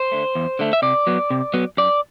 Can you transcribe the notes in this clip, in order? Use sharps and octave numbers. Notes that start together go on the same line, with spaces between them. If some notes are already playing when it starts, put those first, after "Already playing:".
Already playing: C5
D3 A3
E2
D3 A3
E5
C3 D5
F#3 B3
C3
F#3 B3
F#2 D5